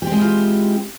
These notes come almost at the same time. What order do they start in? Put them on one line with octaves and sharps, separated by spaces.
G4 C4 G#3 E4 F4